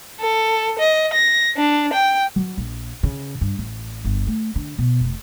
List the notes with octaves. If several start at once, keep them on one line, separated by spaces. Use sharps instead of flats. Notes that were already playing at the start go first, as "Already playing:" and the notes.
A4
D#5
A#6
D4
G5
F#3
A#1
C#3
G2
A1
G1
A3
D3
B2
F1